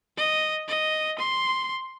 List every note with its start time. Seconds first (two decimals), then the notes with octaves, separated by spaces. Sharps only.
0.17 D#5
0.68 D#5
1.19 C6